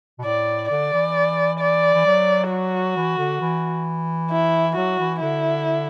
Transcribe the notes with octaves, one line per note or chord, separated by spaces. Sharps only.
B2
A2 D5
D3 D5
E3
D5
E3
F#3
F#4
E3
D3
E3
E4
F#3 F#4
E3
D3 E4